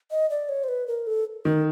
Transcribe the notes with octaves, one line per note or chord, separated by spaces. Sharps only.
D#5
D5
C#5
C5
B4
A#4
A4
D#3 A#4